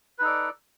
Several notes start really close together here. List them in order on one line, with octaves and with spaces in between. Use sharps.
B4 D#4 A4 D5